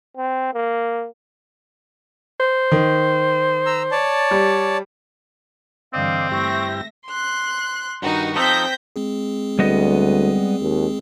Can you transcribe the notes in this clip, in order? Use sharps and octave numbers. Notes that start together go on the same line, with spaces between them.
C4
A#3
C5
D#3
A#5 E6
C#5 D5 A5
G3
G2 D3 E3 C4 D5 D#5 F5
G2 A3 E4 G4 E5 C#6 A#6
C6 F#6
G2 D#3 D#4 F#4
F3 C4 D#4 A4 G6 A#6 B6
G#3 C4 G#4
D2 G3 B3 D#5
D#2